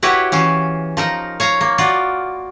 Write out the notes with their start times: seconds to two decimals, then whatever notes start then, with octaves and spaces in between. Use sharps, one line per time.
0.03 E4 F#4 G4 B4 C#5
0.32 E3 C#4 F5
0.97 F3 D#4 A#4
1.40 C#5 F5 A#5
1.61 A#3
1.78 F4 F#4 D5